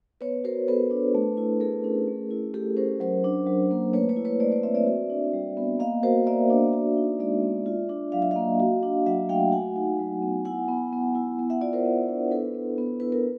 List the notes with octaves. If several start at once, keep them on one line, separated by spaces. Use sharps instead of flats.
B3 B4 C#5
F#4 A#4 C5
B3 A4 B4
D4
A3
E4
A3 G#4 A#4
C#4
A3
E4
A3 G4 A4
C#4 A#4 C5
F#3 A#4 C5
D4
F#3
A#3
A3 B4 C#5
B4 C#5
E4
B4 C#5
A3 C5 D5
C5 D5
C4 D5 E5
D5 E5
F#4
D4
G3
B3
A#3 D#5 F5
F#4 A#4 C5
A#3 D5 E5
D4
F#4
D#4
G#3 D5 E5
B3
F4
D4
F#3 F5
E5
A#3 D#5 F5
F#4
D4
F#3 E5 F#5
A3 F5 G5
F#4 F#5 G#5
D#4
F#3
B3
E4 F#5 G#5
B3
B3
E4
B3
E5 F#5
F4 D5 E5
A#4 C5
B3
D4
E4 A4 B4
B3
B3
E4 B4
A#4